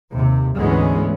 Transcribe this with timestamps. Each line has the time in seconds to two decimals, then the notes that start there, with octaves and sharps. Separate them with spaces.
0.14 D#2 C3
0.58 D2 G#2 E3 G#3 B3 C#4